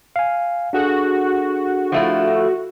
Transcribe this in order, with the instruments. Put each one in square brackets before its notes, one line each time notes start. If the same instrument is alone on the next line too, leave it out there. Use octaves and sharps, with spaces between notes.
[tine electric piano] F5 G#5
[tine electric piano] D4 G#4 A4 [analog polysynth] F#4
[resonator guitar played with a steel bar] F3 A3 E4